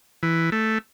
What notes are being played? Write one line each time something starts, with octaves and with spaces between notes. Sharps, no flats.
E3
A3